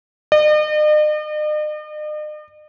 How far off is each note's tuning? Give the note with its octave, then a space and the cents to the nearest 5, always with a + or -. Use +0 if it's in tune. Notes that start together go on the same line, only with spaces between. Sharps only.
D#5 -45